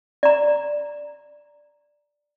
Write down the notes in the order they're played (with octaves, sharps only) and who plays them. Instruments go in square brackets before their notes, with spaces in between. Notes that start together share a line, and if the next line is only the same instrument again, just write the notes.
[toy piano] D5 A#5